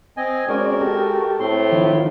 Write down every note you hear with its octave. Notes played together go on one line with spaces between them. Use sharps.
C4 D#5 G#5
G#3 C4 C#4 F#4 A#4 D5
G4 A4
A2 C4 C6
D#3 F3